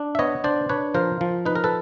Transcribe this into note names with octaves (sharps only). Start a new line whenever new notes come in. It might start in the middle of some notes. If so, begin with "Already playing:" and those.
Already playing: D4
E5
B3 C#5 D#5
D4 C5 D5
D4 B4 C#5
F3 A#4 C5
F3
D#4 B4
A#4
A4 B4